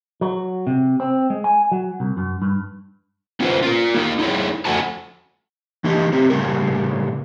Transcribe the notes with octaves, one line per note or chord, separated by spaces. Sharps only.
F#3
C3
C4
G#3
G#5
F#3
C2
F#2
G2
B3 C#4 F4 G#4 B4 C5
F4 A#4
A#3 D#4 A#4
D#4 E4 G#4 C#5
F2 A3 F#4 F#5 G#5 A5
E3 A#3 D4 D#4 G4 D#5
C4 C#4 G4
A2 C#3 G3 A#3 A#4